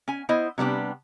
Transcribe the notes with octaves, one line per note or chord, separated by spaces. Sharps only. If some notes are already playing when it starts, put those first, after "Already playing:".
C#4 G#5
B3 E4 C5 D#5
C3 G3 B3 D4 G4